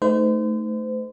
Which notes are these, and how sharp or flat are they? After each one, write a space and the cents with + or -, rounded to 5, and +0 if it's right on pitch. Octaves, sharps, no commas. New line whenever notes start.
A3 +0 D#4 +0 C5 -35